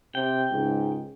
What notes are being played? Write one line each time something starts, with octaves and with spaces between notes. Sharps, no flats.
C3 G5
C#2 G#2